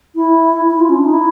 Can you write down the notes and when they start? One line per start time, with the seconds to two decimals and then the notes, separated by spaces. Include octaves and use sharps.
0.15 E4
0.70 E4
0.79 F4
0.89 C#4
0.96 D4
1.04 D#4
1.12 E4